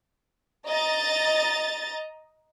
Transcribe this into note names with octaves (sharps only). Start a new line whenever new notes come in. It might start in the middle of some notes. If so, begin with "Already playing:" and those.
D#5 A#5 A6